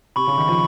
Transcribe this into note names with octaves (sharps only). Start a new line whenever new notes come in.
C3 B5 C#6
C#3
D#3
F3